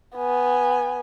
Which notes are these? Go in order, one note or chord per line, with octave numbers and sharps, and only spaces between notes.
B3 G#5